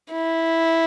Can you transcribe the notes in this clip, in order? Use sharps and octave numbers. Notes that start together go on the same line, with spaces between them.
E4